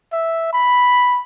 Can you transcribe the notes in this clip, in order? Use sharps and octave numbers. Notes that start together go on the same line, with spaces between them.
E5
B5